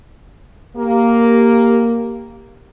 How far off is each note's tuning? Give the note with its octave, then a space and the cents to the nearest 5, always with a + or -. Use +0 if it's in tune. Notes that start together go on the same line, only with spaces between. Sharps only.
A#3 +0 G4 +5